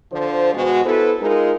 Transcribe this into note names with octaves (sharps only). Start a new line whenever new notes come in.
D3 F3 C5
B2 G#3 F#4
B3 E4 A4 B4 C5
G#3 D#4 F4 G#4 A#4